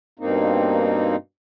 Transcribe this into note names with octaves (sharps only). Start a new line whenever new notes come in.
G2 B2 A#3 C4 D#4